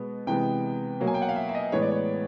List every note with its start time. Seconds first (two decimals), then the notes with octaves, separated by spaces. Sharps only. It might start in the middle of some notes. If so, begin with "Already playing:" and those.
Already playing: B2 G#3 B3
0.27 C3 E3 G#3 B3 G5
1.00 B2 F#3 A#3
1.07 G#5
1.14 G5
1.22 F#5
1.29 F5
1.36 E5
1.49 E5
1.55 D#5
1.72 A2 E3 G#3 B3 C#5
1.82 D5
1.91 C#5